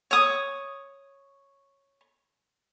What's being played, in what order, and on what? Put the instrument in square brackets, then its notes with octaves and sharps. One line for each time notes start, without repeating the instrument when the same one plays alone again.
[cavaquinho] C#5 D#6